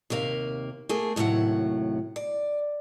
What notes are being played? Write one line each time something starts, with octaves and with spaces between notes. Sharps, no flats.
D#2 C3 A#3 F5
A3 A#3 G#4
D#2 A2 C3 F#3 F#5
D5